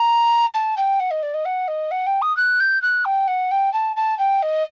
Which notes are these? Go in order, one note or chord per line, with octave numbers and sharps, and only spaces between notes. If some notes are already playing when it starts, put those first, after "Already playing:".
Already playing: A#5
A5
G5
F#5
D#5
D5
D#5
F#5
D#5
F#5
G5
D#6
F#6
G6
F#6
G5
F#5
G5
A5
A5
G5
D#5